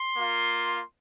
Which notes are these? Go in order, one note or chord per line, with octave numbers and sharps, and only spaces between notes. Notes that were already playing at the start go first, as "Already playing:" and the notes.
Already playing: C6
A#3 F4